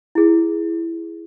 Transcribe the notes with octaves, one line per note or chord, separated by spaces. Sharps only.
E4 G#4